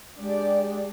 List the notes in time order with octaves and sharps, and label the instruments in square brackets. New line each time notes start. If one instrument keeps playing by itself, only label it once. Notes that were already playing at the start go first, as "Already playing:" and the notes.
[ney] G#3 [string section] D4 G4 D5